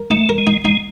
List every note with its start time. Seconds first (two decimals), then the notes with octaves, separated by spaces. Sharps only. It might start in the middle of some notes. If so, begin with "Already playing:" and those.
Already playing: A#4
0.10 A3 D#4
0.29 A#4
0.38 G#3
0.47 D#4
0.64 G#3 D#4